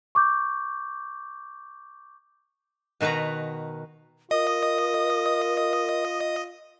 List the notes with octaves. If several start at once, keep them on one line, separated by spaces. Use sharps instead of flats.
C#6 D6 G6
B2 D#3 F#4 B4 A#5
F4 A#4 D#5 D#6